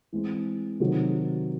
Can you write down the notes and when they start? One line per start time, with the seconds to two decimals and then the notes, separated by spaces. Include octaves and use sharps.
0.13 E3 G#3 C4
0.80 C3 D#3 F#3